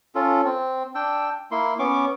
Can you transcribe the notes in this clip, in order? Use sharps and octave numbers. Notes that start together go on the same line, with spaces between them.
C#4 F4 A4
C4
D4 G5 E6
A#3 E4 C6
B3 C#4 C#6 D6